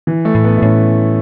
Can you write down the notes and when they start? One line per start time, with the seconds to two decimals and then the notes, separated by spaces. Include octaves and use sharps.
0.07 E3
0.25 A3
0.35 A2
0.44 B3
0.57 E4
0.62 A2 C#4